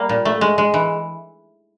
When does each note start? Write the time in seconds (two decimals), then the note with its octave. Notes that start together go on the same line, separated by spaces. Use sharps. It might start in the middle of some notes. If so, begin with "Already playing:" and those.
Already playing: G3 A#3
0.09 A#2
0.25 A3
0.41 G#3
0.58 G#3
0.74 E3